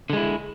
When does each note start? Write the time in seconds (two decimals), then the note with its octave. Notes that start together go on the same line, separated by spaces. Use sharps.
0.10 D3
0.13 G#3
0.17 E4